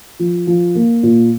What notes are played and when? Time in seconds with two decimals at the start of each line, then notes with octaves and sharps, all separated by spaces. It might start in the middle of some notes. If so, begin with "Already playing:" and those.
0.19 F3
0.47 F3
0.75 A#3
1.03 A#2